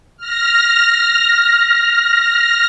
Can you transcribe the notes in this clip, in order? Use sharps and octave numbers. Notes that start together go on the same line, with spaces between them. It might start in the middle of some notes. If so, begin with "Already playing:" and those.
F6 A#6